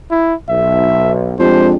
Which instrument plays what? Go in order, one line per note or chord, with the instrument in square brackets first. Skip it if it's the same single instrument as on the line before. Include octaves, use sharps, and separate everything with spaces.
[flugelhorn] E4
[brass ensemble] B1 [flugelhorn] E5
[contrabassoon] F2 [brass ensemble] G#3 D4 G4 [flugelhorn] C5